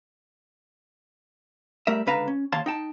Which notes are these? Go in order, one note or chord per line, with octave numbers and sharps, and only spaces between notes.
G3 A3 A#4 E5
C#2 D3 B4 F5 A5 A#5
C#4
D#2 C#5 F5 A5 C6
D#4 G5 A5